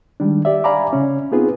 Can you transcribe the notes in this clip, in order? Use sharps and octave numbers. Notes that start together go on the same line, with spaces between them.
D#3 G3 G#3 D4
G4 D5 E5
D5 F5 G#5 A#5 B5 D6
C#3 C#4
B3 C4 D#4 F4 G#4 B4